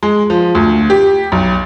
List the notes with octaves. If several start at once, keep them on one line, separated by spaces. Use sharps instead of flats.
G#3
F3
D2
G4
B1